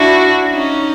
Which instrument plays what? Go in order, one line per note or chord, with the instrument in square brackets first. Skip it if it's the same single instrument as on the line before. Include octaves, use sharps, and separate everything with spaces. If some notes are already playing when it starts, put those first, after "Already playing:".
Already playing: [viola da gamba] D4 E4 [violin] F#4
[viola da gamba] C#4 D#4